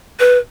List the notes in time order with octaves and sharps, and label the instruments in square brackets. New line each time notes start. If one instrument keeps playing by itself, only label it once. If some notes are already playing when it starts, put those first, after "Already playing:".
[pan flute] B4